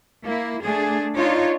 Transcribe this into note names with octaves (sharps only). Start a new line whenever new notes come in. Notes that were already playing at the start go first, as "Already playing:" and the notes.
A#3 E4
A3 D4 G#4
D4 D#4 F4 C#5